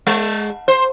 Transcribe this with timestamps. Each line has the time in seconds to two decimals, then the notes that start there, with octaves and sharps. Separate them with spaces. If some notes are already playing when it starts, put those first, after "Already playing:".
0.07 G#3
0.68 C5